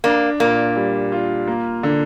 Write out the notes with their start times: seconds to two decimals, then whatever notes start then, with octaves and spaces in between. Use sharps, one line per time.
0.04 A#3 D4
0.40 A#2 A#3
0.76 G3
1.12 F4
1.48 A#3
1.83 D3